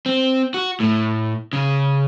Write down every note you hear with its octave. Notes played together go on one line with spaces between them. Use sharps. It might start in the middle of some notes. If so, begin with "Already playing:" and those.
C4
F#4
A2
C#3